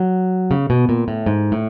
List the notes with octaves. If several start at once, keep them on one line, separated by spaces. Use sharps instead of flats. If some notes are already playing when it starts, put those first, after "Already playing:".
Already playing: F#3
C#3
B2
A#2
A2
G#2
A2